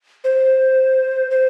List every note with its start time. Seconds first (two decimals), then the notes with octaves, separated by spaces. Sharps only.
0.24 C5
1.31 C5